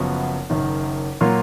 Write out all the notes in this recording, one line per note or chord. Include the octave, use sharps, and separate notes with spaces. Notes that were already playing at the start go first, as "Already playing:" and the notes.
Already playing: F#1 F#2 F3 B3 F#4
F#1 F#2 D#3
A#2 F#3 A#3 F4